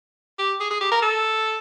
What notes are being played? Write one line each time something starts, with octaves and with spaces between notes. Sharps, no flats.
G4
G#4
G#4
G4
A#4
A4